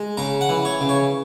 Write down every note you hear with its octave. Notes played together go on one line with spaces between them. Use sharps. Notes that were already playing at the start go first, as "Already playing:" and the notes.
Already playing: G#3
C#3 A#5
F#5
E3
C#5
C#3
C#5